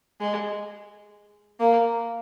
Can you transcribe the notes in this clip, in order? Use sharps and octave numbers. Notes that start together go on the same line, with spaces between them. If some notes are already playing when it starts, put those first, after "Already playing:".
G#3
A#3